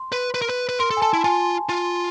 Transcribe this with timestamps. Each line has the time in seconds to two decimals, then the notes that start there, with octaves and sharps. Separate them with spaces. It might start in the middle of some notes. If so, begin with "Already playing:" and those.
Already playing: C6
0.12 B4
0.34 B4
0.42 A#4
0.49 B4
0.69 B4
0.80 A#4 C6
0.91 A4
0.97 G#5
1.02 A4 A5
1.13 E4
1.24 F4 G#5
1.69 F4